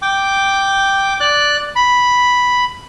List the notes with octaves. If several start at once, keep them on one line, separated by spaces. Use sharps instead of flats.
G5 D6
D5 F#6
B5